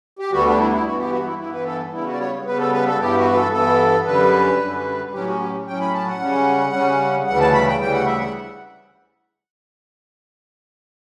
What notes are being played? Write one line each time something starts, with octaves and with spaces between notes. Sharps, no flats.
G4
D2 D3 G3 B3 F#4
D4
E4
E4
G2 E3 B3 F#4
G4
F#4
E4
G2 E3 B3 E4
B4
A4
C#3 G3 B3 E4
F#4
D5
C#5
C#3 G3 B3 B4
A4
B4
A4
G2 E3 B3 G4
F#4
B4
A4
G2 E3 B3 A4
F#2 D3 G3 B4
F#2 D3 G3
A2 F#3 C#4 G4
F#4
G4
A2 F#3 C#4 G5
B5
A5
F#5
C#3 G3 C#4
C#3 G3 C#4
D2 C#3 E3 G3 F#5
A5
B5
G5
D2 C#3 E3 G3 G5
F#5
E5
F#5